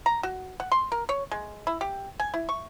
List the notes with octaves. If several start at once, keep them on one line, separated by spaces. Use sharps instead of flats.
A#5
F#4
F#5
C6
A#4
C#5
G#3
E4
G4
G#5
E4
C#6